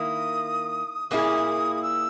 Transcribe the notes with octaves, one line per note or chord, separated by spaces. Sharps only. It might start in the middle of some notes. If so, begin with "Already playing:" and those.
Already playing: D#3 A#3 E4 D#6
A#2 A#3 E4 G#4 D#6
D#6
E6